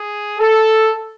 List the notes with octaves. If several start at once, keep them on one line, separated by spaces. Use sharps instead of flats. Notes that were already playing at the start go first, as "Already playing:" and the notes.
Already playing: G#4
A4